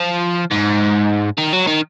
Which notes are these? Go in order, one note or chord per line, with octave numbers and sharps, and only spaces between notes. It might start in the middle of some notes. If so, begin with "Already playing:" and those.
Already playing: F3
G#2
D#3
F#3
D#3